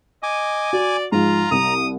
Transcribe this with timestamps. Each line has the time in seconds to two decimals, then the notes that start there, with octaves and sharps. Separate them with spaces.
0.23 D#5 G#5 D6
0.73 F#4 D5
1.12 G#2 F3 F4 A#5
1.51 C2 D#6